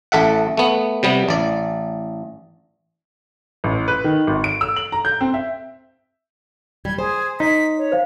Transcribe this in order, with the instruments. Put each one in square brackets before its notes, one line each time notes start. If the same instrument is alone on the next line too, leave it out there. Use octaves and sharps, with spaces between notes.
[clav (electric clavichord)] A1 A4 E5 F#5
A3 B3
C3 G3 B3
A1 D5
[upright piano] A1
B4
D#3
G#1
D7
E6
F#7
A#5
G6
C4
E5
[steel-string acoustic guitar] G3 [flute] G#6
[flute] G#4 [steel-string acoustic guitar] C5
[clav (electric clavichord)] D#4 [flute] B6
[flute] C#5
[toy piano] C5 F5